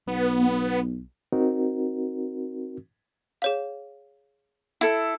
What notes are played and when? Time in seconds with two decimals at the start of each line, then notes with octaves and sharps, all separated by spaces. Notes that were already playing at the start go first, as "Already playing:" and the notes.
0.07 B1 B3
1.33 C4 D#4 F#4 A#4
3.42 G#4 C#5 F5
4.81 E4 A4